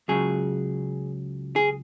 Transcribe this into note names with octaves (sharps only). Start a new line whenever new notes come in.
C#2 C#3 F#3 G#4
G#4